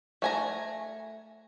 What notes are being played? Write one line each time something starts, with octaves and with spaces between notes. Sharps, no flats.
A3 G#5 A#5